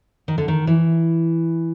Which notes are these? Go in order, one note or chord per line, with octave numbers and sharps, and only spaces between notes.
D#3
D3
D#3
E3